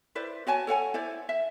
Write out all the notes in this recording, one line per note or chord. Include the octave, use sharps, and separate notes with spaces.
E4 B4 C5 D5
F#4 C#5 G#5 A5
A4 C#5 F#5 G#5
E4 C5 D5
E5